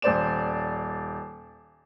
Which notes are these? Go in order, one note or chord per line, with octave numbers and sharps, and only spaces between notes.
D#1 C5 D5 E7